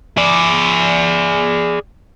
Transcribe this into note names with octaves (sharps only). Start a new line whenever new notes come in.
G#4 D5